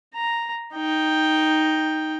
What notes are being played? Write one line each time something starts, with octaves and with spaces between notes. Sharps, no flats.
A#5
D#4 G5